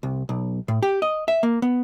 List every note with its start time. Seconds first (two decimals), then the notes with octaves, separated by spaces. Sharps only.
0.03 C2
0.29 B1
0.68 A2
0.83 G4
1.02 D#5
1.28 E5
1.43 A#3
1.62 B3